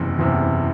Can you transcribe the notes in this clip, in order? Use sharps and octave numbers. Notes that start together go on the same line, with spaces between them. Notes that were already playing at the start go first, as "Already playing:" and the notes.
Already playing: F#1 E2 C3
F#1 E2 C3